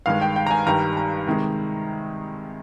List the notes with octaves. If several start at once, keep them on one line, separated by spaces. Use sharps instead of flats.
G2 D#3 G#3 F5
G5
G5
A#5
G#5
G2 D#3 G3 A#5
A#5
C3 D#3 G#3